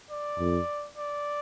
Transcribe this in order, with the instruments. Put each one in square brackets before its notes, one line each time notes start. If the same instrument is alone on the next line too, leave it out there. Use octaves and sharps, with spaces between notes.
[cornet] D5
[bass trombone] F2
[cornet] D5